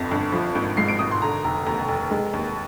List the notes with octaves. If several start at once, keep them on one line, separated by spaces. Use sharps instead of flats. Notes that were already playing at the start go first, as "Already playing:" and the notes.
Already playing: G1 F2 D3 A#6
G1
F3
G#1
G#2 C7
D7
G#1 D#6
C6
D3 A#5
F1 A#5
D#2 A#5
F1
G#3
D#2